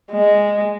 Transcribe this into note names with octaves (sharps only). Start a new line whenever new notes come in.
G#3